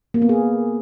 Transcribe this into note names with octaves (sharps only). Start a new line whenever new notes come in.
A#3
B3
G#4